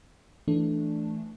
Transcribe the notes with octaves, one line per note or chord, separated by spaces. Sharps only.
E3 A3 D4